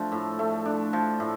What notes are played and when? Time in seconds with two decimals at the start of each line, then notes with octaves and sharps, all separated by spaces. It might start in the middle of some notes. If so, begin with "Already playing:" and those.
Already playing: F3 A3 D4
0.12 A2
0.39 A3
0.65 D4
0.93 F3
1.20 A2